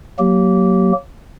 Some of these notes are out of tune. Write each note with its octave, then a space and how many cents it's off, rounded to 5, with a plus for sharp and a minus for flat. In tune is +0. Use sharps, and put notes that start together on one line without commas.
F#3 +0 A#3 +0 G4 -20